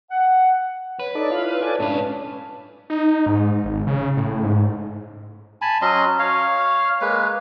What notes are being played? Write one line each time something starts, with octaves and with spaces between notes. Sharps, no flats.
F#5
B4 C#5
D#4 A4 C#5 D5
E4 F4 F5
A4 D5 G#5
G#2 C#4 D4 B4 A5
D#4
G#2
G#1
C#3
A2
G#2
G#5 A5 B5
F#3 C#4 D#5 C6
C#5 F5
G#3 A#3 B4